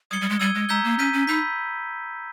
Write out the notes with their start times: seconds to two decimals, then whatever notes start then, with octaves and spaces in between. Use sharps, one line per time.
0.11 G3 D#6 G#6 C#7 G7
0.21 G3
0.30 G#3
0.40 G3 E6 G#6 D#7 G7
0.55 G#3
0.69 G#3 A#5 E6 G6 B6 G7
0.84 A#3
0.99 C#4 G6 B6 D#7
1.13 C#4
1.27 D#4 B5 E6 G6 B6